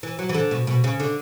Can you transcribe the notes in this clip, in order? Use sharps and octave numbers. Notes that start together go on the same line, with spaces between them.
E3
F#3
E3
D3
B2
B2
C#3
D3